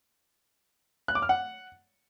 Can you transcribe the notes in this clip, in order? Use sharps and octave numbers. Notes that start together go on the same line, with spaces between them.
F#6
D6
F6
F#5